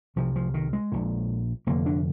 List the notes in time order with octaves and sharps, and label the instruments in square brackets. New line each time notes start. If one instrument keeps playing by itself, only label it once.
[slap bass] C2 C3 F3
F3
D#3
G#3
A#1 A#2
F1 F2 D3 A#3
D4